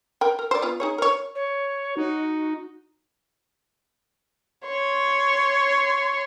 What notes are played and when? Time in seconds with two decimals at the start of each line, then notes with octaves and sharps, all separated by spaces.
0.21 A#4 G5
0.39 A#4
0.51 C5 D5
0.62 B3 F4
0.80 D#4 G#4 C#5
0.98 A#4 C#5
1.35 C#5
1.97 D#4 F#4
4.67 C#5 C6